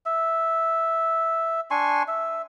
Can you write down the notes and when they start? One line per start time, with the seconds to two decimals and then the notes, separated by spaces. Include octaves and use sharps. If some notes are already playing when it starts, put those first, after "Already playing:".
0.06 E5
1.71 D4 G#5 C6 C#6
2.08 E5